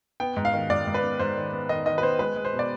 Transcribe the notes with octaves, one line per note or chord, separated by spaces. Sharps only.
B3 G5
G#2
F5
D#3
G#2 D5
G#2
B4
B3
G#2 C5
D#3
B3
D#3 D#5
D#3 D#5
B4
B3 C5
G#3 B4
G#3
C5
B2
D5